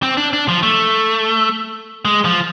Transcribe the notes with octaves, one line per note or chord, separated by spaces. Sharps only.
C4
D4
D4
F3
A3
G#3
F3